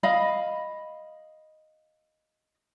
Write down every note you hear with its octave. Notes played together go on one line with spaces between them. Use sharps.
D#5 F5 B5